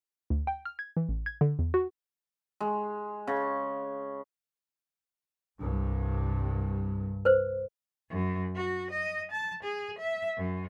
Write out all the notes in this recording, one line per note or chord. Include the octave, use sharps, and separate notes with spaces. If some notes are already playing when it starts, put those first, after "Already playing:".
D2
G5
F6
G#6
E3
A1
G#6
D3
E2
F#4
G#3
C#3
C2 G2
B4 C5
F#2
F#4
D#5
A5
G#4
E5
F#2